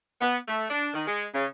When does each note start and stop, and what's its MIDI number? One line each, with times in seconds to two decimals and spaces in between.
0.20 0.37 59
0.48 0.65 57
0.70 0.89 62
0.94 1.02 51
1.07 1.27 56
1.35 1.45 49